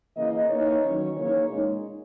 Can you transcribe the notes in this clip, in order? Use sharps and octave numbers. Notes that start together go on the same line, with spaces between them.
C#3 E3 A#3 D#5
E3 A#3 D#4 C#5
D#3 F#3 C#4
C#3 E3 A#3 D#4 C#5
A#2 G#3 C#4 D#4